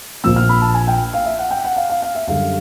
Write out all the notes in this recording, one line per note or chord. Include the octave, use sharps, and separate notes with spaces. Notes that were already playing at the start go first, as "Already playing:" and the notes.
A#1 A#2 F3 A#3 E6
F6
B5
A5
G#5
G5
F5
E5
F#5
G5
F#5
F5
F5
F5
E5
F#2 D3 G3 F5